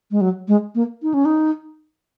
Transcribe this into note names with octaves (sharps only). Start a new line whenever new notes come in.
G#3
F#3
G#3
A#3
D#4
C#4
D#4